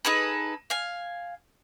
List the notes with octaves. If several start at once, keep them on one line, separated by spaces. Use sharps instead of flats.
D#4 G#4 A4 B4
F5 G#5